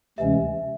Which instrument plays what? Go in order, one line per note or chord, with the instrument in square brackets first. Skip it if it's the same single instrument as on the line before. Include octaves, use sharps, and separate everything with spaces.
[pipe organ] D2 C3 E3 G#3 C#4 [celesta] E5